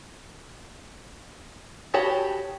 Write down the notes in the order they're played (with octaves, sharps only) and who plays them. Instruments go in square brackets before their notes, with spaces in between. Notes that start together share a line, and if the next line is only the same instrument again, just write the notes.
[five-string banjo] F#4 G4 C#5 A5 B5